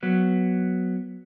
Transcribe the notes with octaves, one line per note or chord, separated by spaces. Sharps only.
F#3 B3